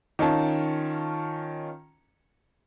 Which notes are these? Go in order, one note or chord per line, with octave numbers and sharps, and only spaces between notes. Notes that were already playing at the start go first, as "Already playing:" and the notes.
D#3 C#4 F4 A5